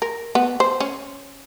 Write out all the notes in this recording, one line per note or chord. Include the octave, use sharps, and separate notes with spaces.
A#4
B3
C5
C#4